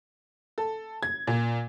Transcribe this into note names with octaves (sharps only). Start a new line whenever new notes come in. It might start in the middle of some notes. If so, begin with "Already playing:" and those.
A4
G#6
A#2